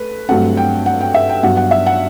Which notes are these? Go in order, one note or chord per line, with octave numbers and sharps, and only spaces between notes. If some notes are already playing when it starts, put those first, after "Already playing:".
Already playing: A3 B4
G2 F#3 A3 C4 F#5
G5
F#5
G5
E5
G5
G2 F#3 B3 F#5
F#5
E5
F#5